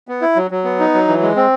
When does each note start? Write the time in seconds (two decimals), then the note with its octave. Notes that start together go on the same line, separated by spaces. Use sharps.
0.08 B3
0.22 E4
0.36 F#3
0.51 F#3
0.64 B3
0.79 D#4
0.94 F#3
1.08 E3
1.22 G#3
1.36 C4